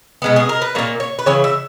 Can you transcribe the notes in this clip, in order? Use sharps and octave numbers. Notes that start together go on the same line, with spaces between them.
B2 G#3 B3
G#4
A#4
B4
A#2 G3 A#3 C#5
C#5
B4
C#3 E3 C#5
E5